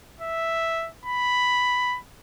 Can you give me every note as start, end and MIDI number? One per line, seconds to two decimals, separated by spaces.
0.21 0.89 76
1.05 1.99 83